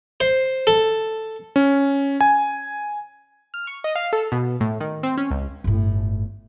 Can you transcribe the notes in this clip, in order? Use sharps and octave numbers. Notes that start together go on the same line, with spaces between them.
C5
A4
C#4
G#5
F6
C#6
D#5
F5
A4
B2
A2
D#3
C4
C#4
C#2
G1 A2